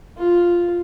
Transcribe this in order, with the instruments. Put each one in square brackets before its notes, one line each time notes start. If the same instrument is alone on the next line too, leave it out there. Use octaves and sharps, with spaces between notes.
[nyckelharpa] F4